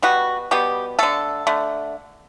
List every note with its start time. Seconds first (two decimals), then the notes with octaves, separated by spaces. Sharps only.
0.02 B2 G3 B3 F#4
0.51 B2 G3 B3 G4
0.99 D3 A3 A4
1.47 D3 A3